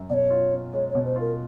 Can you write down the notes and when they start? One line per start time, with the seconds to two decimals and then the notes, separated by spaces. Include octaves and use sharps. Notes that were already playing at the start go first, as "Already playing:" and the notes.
Already playing: F#2
0.10 B2 C#5 D5
0.30 F4
0.52 C#4
0.73 G#3 C#5
0.89 C#5
0.95 B2
1.05 C5
1.16 F4 A#4